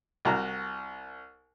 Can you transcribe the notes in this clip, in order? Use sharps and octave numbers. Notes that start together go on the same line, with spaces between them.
C2 F#4 A#5